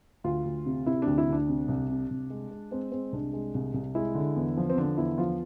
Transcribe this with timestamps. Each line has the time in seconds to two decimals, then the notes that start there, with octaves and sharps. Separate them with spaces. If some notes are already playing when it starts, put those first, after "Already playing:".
0.24 D2 F4
0.45 D2
0.66 C3
0.86 C3 E4
1.02 D2 D4
1.18 E4
1.27 D2
1.32 D4
1.49 C3
1.68 C2
1.90 C3
2.10 C2
2.30 G#3
2.51 G#3
2.71 G#3 C4
2.92 G#3 C4
3.12 C2 D4
3.33 G#3
3.54 C2
3.74 C2
3.95 G#3 E4
4.15 D3
4.36 E2
4.57 F3
4.70 C4
4.78 D3 D4
4.98 E2 E4
5.18 F3 F4